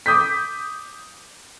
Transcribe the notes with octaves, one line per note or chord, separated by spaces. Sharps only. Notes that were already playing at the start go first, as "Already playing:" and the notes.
D6 D#6 G6 B6